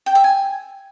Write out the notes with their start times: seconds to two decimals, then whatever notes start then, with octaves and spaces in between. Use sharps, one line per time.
0.06 G5
0.15 E5
0.24 G#5